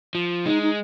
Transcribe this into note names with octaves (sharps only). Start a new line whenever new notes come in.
F3
G#3 D#4
D#4